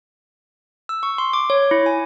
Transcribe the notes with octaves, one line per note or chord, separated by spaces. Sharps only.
E6
C#6
C6
D6
C#5
E4
G#5